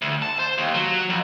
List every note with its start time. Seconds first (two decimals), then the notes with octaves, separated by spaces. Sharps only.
0.02 D2
0.22 A5
0.39 C5
0.58 D#2
0.74 F#3
1.10 F2